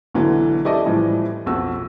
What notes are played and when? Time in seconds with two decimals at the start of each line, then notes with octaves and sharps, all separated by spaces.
0.14 B1 D3 E3 F#3
0.65 E4 G4 A4 D5 D#5 A5
0.86 A2 E3 F3 G3
1.46 B1 F2 F#4 E6